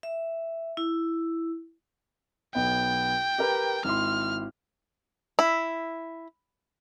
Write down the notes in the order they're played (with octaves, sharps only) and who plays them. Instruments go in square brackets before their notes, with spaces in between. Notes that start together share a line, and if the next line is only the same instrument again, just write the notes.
[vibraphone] E5
E4
[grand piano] B1 B3 [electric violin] G5
[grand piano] G4 A#4 B4
[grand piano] G#1 E4 C6 [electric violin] F6
[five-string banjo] E4